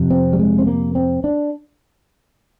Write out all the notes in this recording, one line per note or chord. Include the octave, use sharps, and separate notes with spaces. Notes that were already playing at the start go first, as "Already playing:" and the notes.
Already playing: F2 C3
C4
G3
G#3
C4
A#3
C4
D4